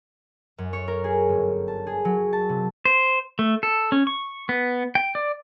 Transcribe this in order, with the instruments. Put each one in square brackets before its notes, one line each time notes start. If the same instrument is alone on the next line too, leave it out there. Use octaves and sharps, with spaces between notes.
[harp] F#2
C#5
A#4
G#4
G1
A5
G#4
F#3
A5
C3
[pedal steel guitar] C5
A3
A4
C#4
C#6
B3
G5
D5